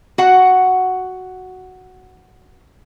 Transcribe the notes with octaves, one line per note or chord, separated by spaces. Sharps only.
F#4 F#5